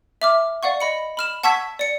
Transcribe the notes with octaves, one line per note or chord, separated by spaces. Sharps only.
E5 D6 F6
D5 F5 F#5 C#6
D#5 B5 C#7
B5 F6 E7
F#5 A5 C#6 E6 G#6 B6
D5 C#7